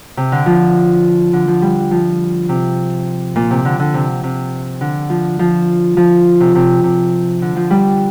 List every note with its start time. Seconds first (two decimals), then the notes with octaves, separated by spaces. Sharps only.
0.17 C3
0.32 D3
0.46 F3
1.33 D3
1.48 F3
1.62 G3
1.91 F3
2.49 C3
3.36 A#2
3.50 C3
3.65 D3
3.79 D3
3.94 C3
4.23 C3
4.81 D3
5.10 F3
5.39 F3
5.97 F3
6.40 C3
6.55 C3
6.84 C3
7.42 D3
7.56 F3
7.70 G3